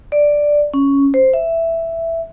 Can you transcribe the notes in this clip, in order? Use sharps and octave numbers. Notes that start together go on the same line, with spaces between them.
D5
C#4
C5
E5